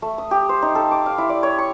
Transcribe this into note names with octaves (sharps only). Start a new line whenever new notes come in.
A3
D#6
G4
C5
D#4
A4
D6
F5
E4
D5
C#5
C#6